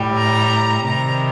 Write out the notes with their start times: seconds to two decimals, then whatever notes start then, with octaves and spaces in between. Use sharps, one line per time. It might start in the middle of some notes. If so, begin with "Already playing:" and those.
Already playing: A2 G3
0.18 A#5
0.85 C3 D#3 G3 A#5